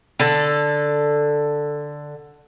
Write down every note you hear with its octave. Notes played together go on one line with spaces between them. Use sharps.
D3 A4